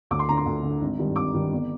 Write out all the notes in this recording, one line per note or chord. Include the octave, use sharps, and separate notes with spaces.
D2 D6
C6
D3 A#5
C6
D2
D3
G#1
G2 D#3
G#1 D6
G2 D#3
G1